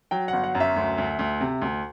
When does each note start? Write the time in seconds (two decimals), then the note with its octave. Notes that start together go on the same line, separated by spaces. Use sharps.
0.11 F#3 G5
0.28 G1 F#5
0.44 F#5
0.55 F#2
0.60 E5
0.76 D2
0.98 D2
1.19 D2
1.41 C3
1.62 D2